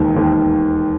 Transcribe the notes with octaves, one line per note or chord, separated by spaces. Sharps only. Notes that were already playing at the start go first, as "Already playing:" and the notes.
Already playing: E1 D#2 D#3
E1 D#2 D#3